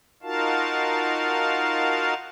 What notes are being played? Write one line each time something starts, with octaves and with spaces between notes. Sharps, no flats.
D#4 F4 F#4 A#4 F5 A5